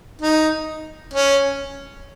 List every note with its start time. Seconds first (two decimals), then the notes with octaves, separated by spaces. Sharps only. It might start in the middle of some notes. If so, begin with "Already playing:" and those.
0.21 D#4
1.13 C#4